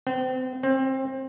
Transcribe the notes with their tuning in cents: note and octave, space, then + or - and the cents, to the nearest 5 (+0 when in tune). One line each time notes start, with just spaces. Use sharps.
C4 -30
C4 +25